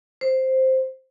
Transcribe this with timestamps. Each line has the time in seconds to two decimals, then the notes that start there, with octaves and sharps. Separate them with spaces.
0.21 C5